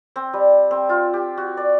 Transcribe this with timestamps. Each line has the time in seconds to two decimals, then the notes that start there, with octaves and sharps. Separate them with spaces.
0.16 C4
0.33 G3
0.71 C4
0.89 F4
1.14 G4
1.38 F#4
1.57 D5